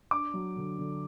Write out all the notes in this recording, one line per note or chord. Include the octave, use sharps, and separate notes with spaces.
D4 D6
F#3
D3
D3